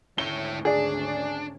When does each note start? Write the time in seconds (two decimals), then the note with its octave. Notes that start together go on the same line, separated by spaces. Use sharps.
0.18 G#1 D2 C#4 E4 C#5 G7
0.65 D4 G#4 D5